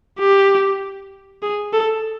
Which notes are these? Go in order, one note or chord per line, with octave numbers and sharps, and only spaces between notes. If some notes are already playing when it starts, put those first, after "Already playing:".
G4
G#4
A4